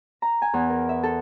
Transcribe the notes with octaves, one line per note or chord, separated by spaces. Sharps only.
A#5
G#5
E2
A#4
E5
A4